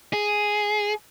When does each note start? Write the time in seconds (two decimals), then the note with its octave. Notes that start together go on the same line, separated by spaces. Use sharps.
0.13 G#4